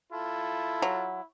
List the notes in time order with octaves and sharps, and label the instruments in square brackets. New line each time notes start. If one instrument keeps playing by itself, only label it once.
[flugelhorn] E4 [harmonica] F4 A4
[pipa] F#3